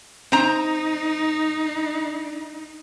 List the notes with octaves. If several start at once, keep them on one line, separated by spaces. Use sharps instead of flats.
C4 D#4 A#5